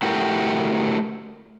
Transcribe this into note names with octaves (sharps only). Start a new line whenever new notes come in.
A3 E4 F#4 G4 A#4